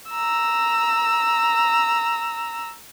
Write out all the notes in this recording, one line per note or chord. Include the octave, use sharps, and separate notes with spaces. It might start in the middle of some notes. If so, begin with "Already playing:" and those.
A#5 E6